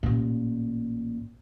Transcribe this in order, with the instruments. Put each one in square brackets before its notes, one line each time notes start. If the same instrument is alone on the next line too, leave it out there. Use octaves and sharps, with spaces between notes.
[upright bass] A1 A#2